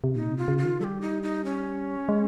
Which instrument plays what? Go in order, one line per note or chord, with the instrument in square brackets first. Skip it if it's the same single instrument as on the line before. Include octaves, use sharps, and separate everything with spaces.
[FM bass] C3
[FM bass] A#2 [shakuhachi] D#4
[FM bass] C3
[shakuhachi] F4
[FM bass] C#3
[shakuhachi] F4
[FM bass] D#3
[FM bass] G3 [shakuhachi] G4 A4
[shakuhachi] D#4
D#4
C#4
[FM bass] G#3